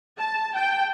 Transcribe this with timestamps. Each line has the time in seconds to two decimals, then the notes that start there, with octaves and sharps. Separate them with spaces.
0.18 A5
0.56 G5